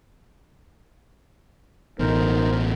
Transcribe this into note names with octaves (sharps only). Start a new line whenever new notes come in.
A1 B2 D#4 A#4 C5